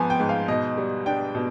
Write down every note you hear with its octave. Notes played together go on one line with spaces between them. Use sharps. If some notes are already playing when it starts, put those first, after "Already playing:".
Already playing: G#2 F3 B3 G#5
G5
G#2
F5
B2 D#5
G3
D4 G5
B2